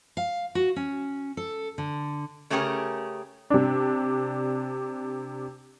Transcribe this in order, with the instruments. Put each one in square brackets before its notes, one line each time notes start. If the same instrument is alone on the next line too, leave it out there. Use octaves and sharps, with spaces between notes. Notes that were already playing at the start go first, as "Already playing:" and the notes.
[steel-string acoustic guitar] F5
F#4
C#4
A4
D3
[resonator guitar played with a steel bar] C#3 A3 C#4 G4 G#4 A#4
[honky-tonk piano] C3 D4